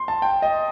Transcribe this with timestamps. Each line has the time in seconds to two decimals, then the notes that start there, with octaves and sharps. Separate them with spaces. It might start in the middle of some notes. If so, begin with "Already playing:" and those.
Already playing: C6
0.08 A5
0.22 G5
0.42 D#5